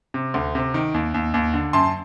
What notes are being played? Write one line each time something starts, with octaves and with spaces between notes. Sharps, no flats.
C3
D2
C3
D#3
D#2
D#2
D#2
D3
F#2 A5 C6